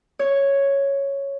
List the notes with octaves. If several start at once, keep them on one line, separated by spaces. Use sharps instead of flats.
C#5